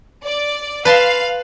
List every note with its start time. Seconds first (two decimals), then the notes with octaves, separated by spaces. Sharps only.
0.25 D5
0.85 B4 F5 A5 C6